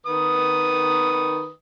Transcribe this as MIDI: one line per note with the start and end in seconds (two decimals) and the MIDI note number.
0.06 1.50 51
0.06 1.50 71
0.06 1.50 87